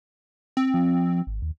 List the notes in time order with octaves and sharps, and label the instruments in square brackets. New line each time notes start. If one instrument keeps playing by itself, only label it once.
[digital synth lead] C4
[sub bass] F3
G#1
D#2